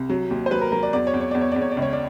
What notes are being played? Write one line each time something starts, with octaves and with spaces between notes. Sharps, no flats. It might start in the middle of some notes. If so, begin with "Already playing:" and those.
Already playing: C2
F#3
D#2
C5
F#3 B4
A#4
F#3 A#4
D5
E2 D5
C#5
E2
C#5
E2 D5
C#5
E2 D5
C#5
D5
C#2
C#5
D5